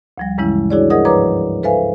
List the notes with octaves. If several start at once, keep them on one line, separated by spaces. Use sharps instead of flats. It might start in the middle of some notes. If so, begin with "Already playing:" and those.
D2 F3 G3
G2 C#3 E3 G#3 C#4 E4
D4 E4 F#4 G#4 C#5 D5
G#4 A#4 D#5 F#5 D#6
G#2 F3 B4 C#5 A#5 D6
A4 B4 C5 E5 F5 G#5